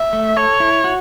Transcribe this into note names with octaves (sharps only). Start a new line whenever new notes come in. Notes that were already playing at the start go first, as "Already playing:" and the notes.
Already playing: E5
A3
A4 C#5
E4
F#4